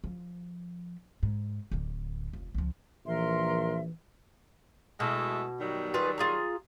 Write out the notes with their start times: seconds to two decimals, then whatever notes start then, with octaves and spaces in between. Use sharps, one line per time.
0.04 F3
1.23 G#2
1.71 D1 D3
2.33 F1
2.54 C#2 F3
3.06 A#1 E3 A#4 E5 C6
5.00 B2 G#3 A3 E4
5.60 D#3 F#3 G3
5.94 F4 G#4 B4
6.18 F4 G#4 A#5